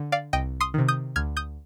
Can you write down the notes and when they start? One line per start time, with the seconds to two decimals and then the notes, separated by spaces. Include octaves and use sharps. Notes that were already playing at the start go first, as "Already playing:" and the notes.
Already playing: D3
0.12 D5 F5
0.33 C2 D#5 G5
0.60 C6 D#6
0.74 C3 D#3
0.88 D#6 G6
1.16 D2 F6 G#6
1.37 D#6 G6